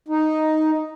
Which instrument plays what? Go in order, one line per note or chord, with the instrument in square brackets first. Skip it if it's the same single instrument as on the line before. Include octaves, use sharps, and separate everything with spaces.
[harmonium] D#4